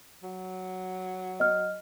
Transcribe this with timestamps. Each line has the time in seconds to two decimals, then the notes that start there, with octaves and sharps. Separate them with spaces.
0.23 F#3
1.40 D#5 F6